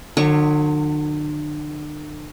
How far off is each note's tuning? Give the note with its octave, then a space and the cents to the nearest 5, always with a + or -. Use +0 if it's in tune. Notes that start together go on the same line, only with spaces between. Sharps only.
D3 +40 F#3 -25 C#6 +5